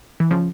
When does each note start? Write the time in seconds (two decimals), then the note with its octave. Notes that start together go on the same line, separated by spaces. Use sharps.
0.20 E3
0.31 C#3 F3